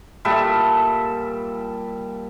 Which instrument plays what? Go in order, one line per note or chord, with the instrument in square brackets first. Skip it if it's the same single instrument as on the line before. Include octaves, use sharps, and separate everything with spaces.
[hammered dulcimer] A#2 G3 A4 E5